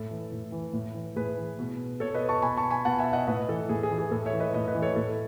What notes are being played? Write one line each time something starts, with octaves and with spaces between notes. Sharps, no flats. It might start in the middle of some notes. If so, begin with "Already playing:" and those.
Already playing: A2 A4
E3
A2
E3
A2
E3
A2 G#4 B4
E3
B2
B2 A4 C#5
B4 D#5
A5 C#6
B2 G#5 B5
A5 C#6
G#5 B5
B2 F#5 A5
E5 G#5
D#5 F#5
A2 B4 D#5
E3 A4
A2 G#4
G#4
E3
G#4
A2 A4
C#5 E5
E3
B4 D#5
A2 B4 D#5
B4 D#5
E3
A4 C#5
A2 A4